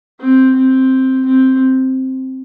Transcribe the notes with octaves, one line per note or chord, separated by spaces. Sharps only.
C4
C4
C4